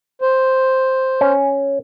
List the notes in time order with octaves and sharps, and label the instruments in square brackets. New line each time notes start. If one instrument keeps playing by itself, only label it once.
[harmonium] C5
[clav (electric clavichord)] C#4